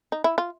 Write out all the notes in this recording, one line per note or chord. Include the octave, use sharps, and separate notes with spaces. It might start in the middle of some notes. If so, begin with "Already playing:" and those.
D#4
E4
F4